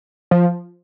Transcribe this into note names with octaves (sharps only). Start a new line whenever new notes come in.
F3